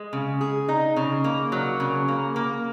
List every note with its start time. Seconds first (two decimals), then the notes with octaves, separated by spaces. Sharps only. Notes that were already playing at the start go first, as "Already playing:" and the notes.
Already playing: G#3
0.13 C#3
0.41 G#4
0.68 D#4
0.96 C#3
1.24 A#3
1.52 F#3
1.80 C#3
2.08 A#3
2.36 A#3